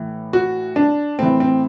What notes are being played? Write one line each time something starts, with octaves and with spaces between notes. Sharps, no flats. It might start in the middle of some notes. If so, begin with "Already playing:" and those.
Already playing: A2 E3
F#4
D4
A2 E3 C4
C4